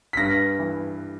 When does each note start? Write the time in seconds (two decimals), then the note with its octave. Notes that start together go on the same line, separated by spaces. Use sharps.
0.13 B6
0.17 G2 A#6
0.59 E3